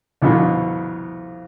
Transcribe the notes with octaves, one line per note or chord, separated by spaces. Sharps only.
C2 F2 B2 D3